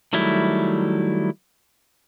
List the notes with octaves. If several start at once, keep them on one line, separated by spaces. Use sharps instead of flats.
D#3 F#3 G3 A3 E4